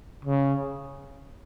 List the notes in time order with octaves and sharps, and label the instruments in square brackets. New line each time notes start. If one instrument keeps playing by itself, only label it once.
[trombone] C#3